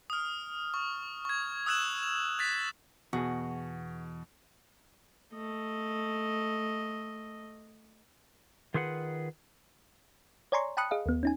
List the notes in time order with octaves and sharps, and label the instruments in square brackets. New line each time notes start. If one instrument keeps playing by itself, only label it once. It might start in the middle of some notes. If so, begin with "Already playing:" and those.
[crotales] D#6 F6
C#6
C#6 G#6
D#6 E6 F#6 G#6 E7 F#7
F7
F#6 A6 B6
[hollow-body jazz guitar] E2 G#4 [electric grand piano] B2 [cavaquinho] F#4
[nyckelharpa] A3 D#5
[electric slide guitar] D#3 F4 G#4 B4 F#5
[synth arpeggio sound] C#5 D5 G#5 A#5 C6 C#6
G5 A5 B5 D#6 F#6 C#7
G#4 D#5 F5
D#2 B3
C#4 D#4 G#5